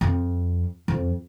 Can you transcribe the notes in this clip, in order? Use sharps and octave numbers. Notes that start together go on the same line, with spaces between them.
F2
F2